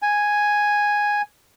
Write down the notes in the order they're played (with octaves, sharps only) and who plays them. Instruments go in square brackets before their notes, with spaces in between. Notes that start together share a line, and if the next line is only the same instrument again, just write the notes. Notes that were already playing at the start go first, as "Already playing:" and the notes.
[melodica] G#5